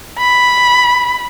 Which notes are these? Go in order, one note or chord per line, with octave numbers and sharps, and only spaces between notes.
B5